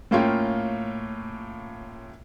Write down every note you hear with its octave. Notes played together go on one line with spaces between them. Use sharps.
A2 A#3 C#4 F4 G5